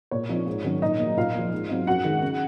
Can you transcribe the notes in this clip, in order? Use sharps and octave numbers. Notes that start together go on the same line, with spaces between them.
A#2 C#5
F3 C4 D#4
G#2
D#3 F#3 C#4
A#2 D#4 D#5
F#3 A#3
A#2 F4 F5
F3 A#3
G#2
F#3 C4 D#4
F#2 F#4 F#5
D#3 G#3
C#3